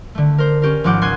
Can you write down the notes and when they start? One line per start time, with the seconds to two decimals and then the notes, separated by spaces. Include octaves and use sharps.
0.15 D3 A3
0.38 A#4 C5
0.62 C#4 G4 A#4
0.84 G#1 F3 F#5 D6 G6
1.01 C#2 C#4 C6 F#6 G#6 D#7